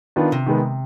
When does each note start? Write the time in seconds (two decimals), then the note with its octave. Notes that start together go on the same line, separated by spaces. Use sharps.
0.16 D#3 B3 D4 F4
0.32 C3
0.46 D#3 G#3 B3